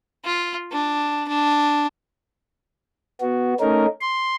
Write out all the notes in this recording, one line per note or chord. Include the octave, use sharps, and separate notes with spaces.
F4
D4
D4
B3 F#4
A3 C#4 D#4 A#4
C6